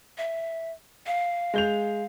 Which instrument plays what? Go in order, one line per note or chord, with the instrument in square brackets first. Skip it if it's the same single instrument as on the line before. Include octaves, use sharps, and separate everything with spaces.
[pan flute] E5
F5
[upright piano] G#3 G6 F7